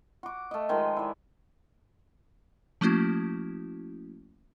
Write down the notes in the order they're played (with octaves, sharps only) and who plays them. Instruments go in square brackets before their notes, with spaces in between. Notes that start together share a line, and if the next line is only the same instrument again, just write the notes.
[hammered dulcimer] F#4 D6
A3 D#5
D#3 F3 G#3 G5
E4 D5
[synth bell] F3 A3 A#3 C#4 E4 F#4